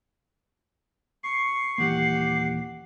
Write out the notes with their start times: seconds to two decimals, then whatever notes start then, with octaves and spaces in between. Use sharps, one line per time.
1.23 C#6 C7
1.78 D#1 E3 A#3 G4 F#5